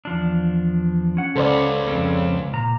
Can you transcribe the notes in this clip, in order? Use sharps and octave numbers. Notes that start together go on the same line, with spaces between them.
E2 F3 D4
C#4 F#5
C#2 A4 C5 D5
F2 C4 C#4
A#2 A#5